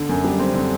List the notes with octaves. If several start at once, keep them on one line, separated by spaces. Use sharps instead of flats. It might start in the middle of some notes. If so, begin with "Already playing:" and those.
Already playing: D3
F#2
G3
C4
D3